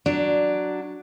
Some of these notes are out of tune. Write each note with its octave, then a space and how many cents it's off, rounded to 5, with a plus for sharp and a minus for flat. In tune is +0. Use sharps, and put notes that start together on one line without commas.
F#3 +0 D4 +0